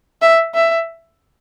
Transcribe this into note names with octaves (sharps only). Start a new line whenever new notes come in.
E5
E5